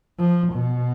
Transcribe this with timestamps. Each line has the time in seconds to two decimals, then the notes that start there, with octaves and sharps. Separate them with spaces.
0.19 F3
0.53 B2